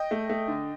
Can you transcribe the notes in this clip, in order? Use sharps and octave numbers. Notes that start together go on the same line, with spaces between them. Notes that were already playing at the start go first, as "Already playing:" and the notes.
Already playing: D#5 G5
A3
A3
D3